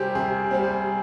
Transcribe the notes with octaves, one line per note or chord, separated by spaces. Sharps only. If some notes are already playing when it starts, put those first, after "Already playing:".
Already playing: C3 G3 C4 G4 G#4 A#4
C3 G#4
G3 C4
G#4